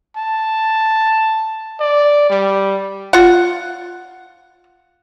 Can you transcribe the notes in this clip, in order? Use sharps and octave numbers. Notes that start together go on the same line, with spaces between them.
A5
D5
G3
F4 F#5